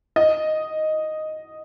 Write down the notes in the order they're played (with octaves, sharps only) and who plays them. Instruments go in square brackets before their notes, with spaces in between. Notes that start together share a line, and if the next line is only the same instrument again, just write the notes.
[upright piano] D#5